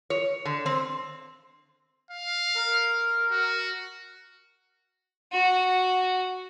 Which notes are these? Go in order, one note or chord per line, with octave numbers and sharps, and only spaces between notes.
C#5
D3
C4
F5
A#4
F#4
F#4